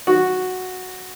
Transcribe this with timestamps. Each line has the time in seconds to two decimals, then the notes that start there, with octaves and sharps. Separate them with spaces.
0.07 F#4